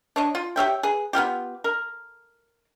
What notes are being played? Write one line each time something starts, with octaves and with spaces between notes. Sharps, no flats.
D4 C#5 D#5
F4
G4 C#5 E5 G5
G#4 B4
B3 E4 F4 G4
A#4